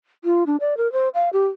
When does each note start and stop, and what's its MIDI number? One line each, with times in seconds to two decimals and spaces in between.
0.25 0.44 65
0.46 0.57 62
0.60 0.77 74
0.77 0.91 70
0.93 1.09 72
1.15 1.29 77
1.33 1.46 67